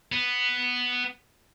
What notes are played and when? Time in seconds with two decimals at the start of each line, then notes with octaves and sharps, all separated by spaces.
0.12 B3